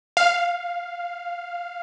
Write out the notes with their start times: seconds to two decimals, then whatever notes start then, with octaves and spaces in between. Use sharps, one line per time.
0.17 F5